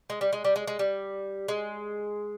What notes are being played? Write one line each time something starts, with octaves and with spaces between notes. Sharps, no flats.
G#3
G3
G#3
G3
G#3
G#3
G3
G#3